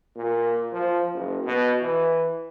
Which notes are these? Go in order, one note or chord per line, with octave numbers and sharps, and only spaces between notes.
A#2
F3
F#1
B2
E3